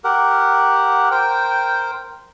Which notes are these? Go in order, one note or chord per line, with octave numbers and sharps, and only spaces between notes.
G4 A#4 F#5
A#4 C5 G5